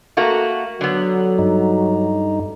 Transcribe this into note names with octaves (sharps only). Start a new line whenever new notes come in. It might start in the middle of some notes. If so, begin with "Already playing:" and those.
A3 A#3 F#4
D3 F#3 B3
G2 D#4